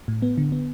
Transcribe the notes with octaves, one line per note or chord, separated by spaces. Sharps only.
A2
B3
D3
B3